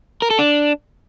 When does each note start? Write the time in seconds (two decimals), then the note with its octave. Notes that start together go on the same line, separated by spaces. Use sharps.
0.22 A#4
0.30 A4
0.39 D4